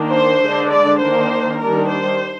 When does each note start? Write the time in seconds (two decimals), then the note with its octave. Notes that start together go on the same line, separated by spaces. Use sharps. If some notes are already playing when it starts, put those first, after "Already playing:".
Already playing: D#3 A#3 D4
0.11 C5
0.41 D3 G#3 D4
0.70 D5
1.00 D#3 A#3 D4 C5
1.61 D#3 G3 D4 A#4
1.90 C5